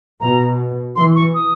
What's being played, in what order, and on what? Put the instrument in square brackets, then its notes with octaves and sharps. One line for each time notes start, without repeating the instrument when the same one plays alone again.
[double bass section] B2 [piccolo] A#5
[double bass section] E3 [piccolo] C6
[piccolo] C#6
D#6